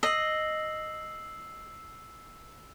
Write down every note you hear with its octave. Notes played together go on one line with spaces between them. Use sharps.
D#5 E6 C7 F#7